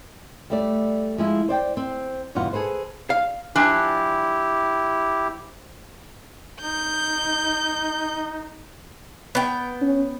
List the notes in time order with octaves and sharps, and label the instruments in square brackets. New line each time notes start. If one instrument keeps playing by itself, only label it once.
[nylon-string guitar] G3 A3 D5
F3 G#3 E4
C5 D5 G5
C4
E2 G2 B2 F4 F#5
G#4 A4 B4 C5
[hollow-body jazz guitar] F5
[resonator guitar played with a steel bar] F3 D4 G#5 [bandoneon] E4 G4
[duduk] D#4 [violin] G6
[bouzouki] B3 G5
[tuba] C#4